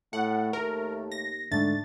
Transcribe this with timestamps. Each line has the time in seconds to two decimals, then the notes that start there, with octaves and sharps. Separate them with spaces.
0.13 A2 A3 F#5
0.53 D#2 A#4
1.12 A#6
1.52 G#2 D3 A3 D4 A6